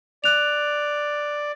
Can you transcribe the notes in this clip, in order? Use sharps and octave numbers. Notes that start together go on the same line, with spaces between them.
D5 F#6 F7